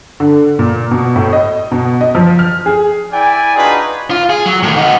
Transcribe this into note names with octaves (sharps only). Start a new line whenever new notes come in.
D3
A#2
B2
A2
D#5
B2
D#5
F3
F6
G#4
E4 D5 G5 G#5
D4 D#4 F4 F#4 G#4 B4
F4
G#4
F#3
A2 D#3
D#4 F#4